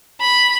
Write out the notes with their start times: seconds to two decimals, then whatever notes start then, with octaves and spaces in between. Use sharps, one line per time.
0.21 B5